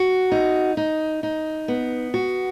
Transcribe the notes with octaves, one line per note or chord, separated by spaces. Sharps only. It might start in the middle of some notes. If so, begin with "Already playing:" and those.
Already playing: F#4
D#4
D#4
D#4
B3
F#4